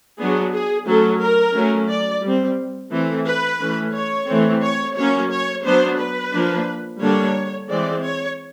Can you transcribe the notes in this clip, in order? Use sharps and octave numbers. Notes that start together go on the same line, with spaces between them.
F#3 B3 D4 G#4
G#4
F#3 A3 C#4 A4
A#4
F#3 A3 C#4
D5
G3 C4
E3 A3 C4
B4
E3 A3 C#4
C#5
E3 A3 C4
C#5
F#3 A#3 C#4 C#5
C#5
F#3 B3 D4 C5
B4
F3 A#3 D4
D3 G3 A#3 D4 C#5
E3 G#3 C4 D5
C#5